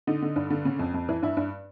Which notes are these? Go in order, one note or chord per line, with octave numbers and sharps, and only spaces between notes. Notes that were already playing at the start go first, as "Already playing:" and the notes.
D3 D#4
D3
G2
D3
C#3
F2
F2
E3
G2 E4
G2